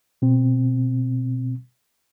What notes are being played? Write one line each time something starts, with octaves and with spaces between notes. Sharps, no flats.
B2 C4